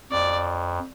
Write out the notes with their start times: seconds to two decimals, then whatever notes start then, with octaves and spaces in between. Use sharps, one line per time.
0.12 F2 D5